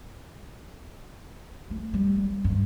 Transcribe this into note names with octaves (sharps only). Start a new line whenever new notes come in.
A3
G3
B3
G2